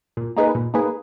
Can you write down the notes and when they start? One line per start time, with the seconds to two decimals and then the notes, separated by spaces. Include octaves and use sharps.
0.17 A#2
0.37 A#3 D#4 G#4 B4
0.55 A#2
0.74 A#3 D#4 G#4 B4